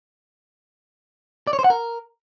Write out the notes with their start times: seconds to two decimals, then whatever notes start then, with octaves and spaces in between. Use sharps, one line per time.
1.47 D5
1.53 C#5
1.59 C5
1.64 F#5
1.70 A#4